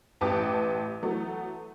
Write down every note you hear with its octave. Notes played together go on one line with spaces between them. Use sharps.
A1 G4 B4 A5 D6 D#6
E3 F#3 A3 B3